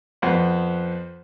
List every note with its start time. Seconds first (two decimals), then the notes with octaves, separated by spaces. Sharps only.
0.22 F2 B3 B4 C5 F#5 C6